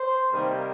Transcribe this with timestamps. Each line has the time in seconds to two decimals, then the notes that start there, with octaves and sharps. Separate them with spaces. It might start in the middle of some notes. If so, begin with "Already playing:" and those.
Already playing: C5
0.32 C3 D#3 G3 A#3 A#4